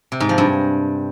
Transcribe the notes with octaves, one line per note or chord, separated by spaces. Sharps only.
C3
G#2
F3
G2